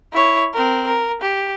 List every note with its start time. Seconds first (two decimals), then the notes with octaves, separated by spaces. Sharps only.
0.13 E4 C#5
0.54 C4 A#4
0.87 A#4
1.21 G4